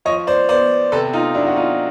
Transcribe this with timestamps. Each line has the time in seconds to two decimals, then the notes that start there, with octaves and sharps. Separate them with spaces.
0.05 F3 C#5 D#5
0.27 C5 D5
0.49 B3 C5 D5
0.92 C3 A4 B4
1.13 D#4 F4
1.35 F#3 D4 E4
1.47 F#4
1.56 D#4 F4